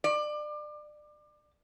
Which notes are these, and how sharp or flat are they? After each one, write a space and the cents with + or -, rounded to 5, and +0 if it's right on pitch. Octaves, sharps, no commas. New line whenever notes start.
D5 +30